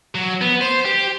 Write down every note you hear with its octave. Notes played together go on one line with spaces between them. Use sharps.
F#3
B3
C5
G4